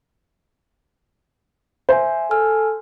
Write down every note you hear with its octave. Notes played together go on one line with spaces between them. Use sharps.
C5 E5 G#5
A4 G#5 E6 F6